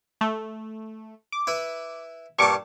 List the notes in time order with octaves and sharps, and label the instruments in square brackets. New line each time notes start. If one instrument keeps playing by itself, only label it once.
[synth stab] A3
D6
[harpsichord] E4 B4
[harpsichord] G2 A#2 A5 [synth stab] C#6 D6